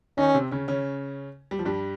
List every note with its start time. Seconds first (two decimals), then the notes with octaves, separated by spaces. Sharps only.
0.18 D#3 C#4 D#4
0.34 C3 C4
0.51 C#3 C#4
0.68 C#3 C#4
1.51 G3
1.59 F3
1.65 G2 G3